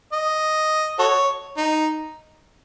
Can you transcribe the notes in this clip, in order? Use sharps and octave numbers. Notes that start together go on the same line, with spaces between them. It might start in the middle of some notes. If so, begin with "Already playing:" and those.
D#5
F#4 A4 C#5
D#4